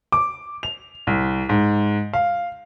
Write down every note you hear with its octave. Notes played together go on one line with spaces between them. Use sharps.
D6
F7
C2
G#2
F5